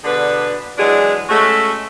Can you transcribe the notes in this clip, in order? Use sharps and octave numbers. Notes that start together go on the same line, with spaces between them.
B2 D3 D4 G#4 B4
E3 F#3 G#3 D4 G#4
G#3 A3 C#4 F#4 G#4 A4